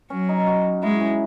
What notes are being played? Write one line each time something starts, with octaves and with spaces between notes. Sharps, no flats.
F#3 C#4
D#4
F#4
G#3 E4
C#4